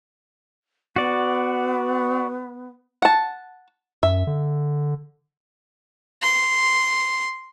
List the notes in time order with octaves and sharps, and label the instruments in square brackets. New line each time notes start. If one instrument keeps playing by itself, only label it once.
[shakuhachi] B3 [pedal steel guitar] F#4 D5
[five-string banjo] F#5 A5
[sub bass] F#2 [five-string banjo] E5
[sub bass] D3
[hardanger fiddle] C6